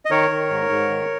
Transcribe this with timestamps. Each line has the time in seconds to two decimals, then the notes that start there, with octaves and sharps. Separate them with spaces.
0.05 D#5
0.10 D#3 A#4 C#5
0.30 D#3
0.50 G#2
0.69 G#2
0.89 D#3